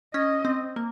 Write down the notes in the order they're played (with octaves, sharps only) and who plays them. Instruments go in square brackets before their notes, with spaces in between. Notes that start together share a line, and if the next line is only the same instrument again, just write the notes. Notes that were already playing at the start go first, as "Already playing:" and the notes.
[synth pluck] C#4 [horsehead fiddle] D#5
[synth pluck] C4
A#3